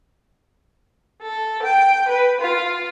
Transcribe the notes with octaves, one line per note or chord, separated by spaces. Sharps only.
A4
G5
B4
F4